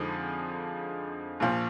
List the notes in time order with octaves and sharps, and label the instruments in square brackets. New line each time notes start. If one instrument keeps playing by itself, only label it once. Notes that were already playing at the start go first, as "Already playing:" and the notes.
Already playing: [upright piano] F2 D3 F3 G#3 D#4
A#1 A#2 F3